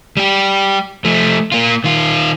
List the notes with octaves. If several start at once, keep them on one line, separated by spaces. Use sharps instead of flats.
G3 G4
F3 A3
A#3 F4
D#3 F4